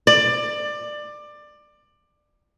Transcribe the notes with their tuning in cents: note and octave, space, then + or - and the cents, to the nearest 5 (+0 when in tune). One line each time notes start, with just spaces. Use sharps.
D5 +20